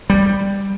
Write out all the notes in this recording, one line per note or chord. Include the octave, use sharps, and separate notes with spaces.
G3